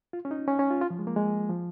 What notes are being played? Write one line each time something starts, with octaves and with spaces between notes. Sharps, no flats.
F4
C#4
D#4
C#4
C#4
F4
F4
F3
G#3
A#3
G#3
F3